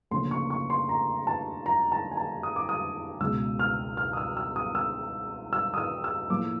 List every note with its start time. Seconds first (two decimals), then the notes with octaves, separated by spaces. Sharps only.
0.11 D2 C#3 F3 A#3 C#4 C6
0.31 C#6
0.50 C#6
0.70 C6
0.89 A#5
1.27 A5
1.66 A#5
1.92 A5
2.12 G#5
2.17 A5
2.43 D#6
2.56 D6
2.69 D#6
3.20 C#2 B2 G#3 E6
3.59 F6
3.97 F6
4.13 D#6
4.17 E6
4.37 E6
4.56 D#6
4.75 E6
5.53 E6
5.74 D#6
5.78 E6
6.04 E6
6.29 A2 F3 A#3 D6